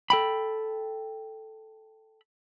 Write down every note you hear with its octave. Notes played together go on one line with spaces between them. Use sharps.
A4 G5 B5